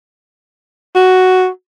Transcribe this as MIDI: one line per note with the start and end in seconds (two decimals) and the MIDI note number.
0.95 1.48 66